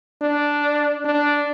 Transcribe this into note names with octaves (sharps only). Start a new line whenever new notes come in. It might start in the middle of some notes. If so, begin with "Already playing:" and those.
D4
D4